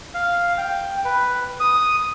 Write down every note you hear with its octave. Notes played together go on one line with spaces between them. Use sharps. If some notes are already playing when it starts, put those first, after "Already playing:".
F5
G5
B4
D#6